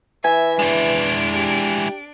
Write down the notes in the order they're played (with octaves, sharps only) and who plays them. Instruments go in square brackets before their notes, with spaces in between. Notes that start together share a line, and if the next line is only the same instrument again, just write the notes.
[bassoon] E3 [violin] E5 [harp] G#5
[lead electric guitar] G#3 E4 [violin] D4 D7
[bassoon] G4